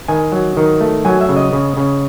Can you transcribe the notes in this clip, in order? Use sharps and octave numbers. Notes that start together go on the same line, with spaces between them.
D#3 G#5
F#3
D#3
A3
F#3 G#5
E5
C#3
D#5
C#3
C#3